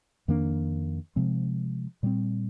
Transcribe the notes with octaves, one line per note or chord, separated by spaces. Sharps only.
F2 D#3 A#3 D4
C3 F3 G#3 C4
A#2 G3 C4